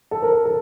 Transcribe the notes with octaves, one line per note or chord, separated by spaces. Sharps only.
A4
A#4
A4
A4